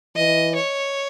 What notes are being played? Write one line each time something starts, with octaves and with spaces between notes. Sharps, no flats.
E3 D#5
C#5